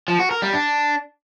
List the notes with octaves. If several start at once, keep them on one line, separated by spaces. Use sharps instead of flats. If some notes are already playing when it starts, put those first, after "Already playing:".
F3
F#4
A#4
G3
D4